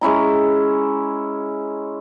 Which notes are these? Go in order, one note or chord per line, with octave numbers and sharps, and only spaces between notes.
G#3 C#4 E4 A#5